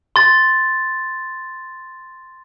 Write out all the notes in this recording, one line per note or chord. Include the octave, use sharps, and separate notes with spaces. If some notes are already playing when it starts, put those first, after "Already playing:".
C6 A6